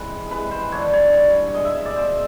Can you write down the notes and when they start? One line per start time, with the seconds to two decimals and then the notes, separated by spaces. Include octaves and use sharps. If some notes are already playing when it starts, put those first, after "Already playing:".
Already playing: C3 E3 G#3 B4
0.31 C3 E3 G#3 B4
0.51 C5
0.72 G2 D3 G3 C#5
0.93 C#5
1.13 G2 D3 G3
1.54 B2 G#3 D#5
1.64 E5
1.75 E5
1.86 D5
1.96 B2 G#3 C5